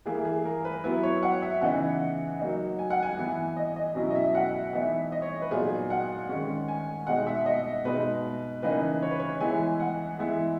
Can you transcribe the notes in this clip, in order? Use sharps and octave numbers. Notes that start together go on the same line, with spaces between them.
E3 A#3 E4 G#4
G#4
A#4
B4
F#3 B3 E4 B4
C#5
F#5
E5
C#3 E3 B3 D#4 F#5
F#3 A#3 D#4
G#5
F#5
G#5
E3 B3 E4
D#5
D#5
B2 F#3 C#4 E4 D#5
D#5
E5
F#5
E3 B3 D#4 E5
D#5
C#5
B4
A#2 F#3 B3 D#4 G#4
F#5
D#3 G#3 C#4
G#5
B2 G#3 D#4 F#5
E5
D#5
B2 G#3 D#4 B4
C#3 E3 A#3 D#4 B4
C#5
B4
C#5
E3 G#3 B3 E4 G#5
F#5
E3 G#3 B3 E4